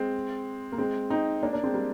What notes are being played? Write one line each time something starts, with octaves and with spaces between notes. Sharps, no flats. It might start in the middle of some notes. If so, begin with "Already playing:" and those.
Already playing: G#3 C4
A#3
G#3 C4
C4 D#4
A#3 D4
A#3 D4
G#3 C4
G3 A#3